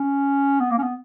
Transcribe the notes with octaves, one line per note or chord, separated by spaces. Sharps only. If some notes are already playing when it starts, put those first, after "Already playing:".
Already playing: C#4
B3
A#3
C#4
B3